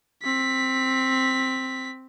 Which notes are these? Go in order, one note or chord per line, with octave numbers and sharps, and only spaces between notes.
C4 B6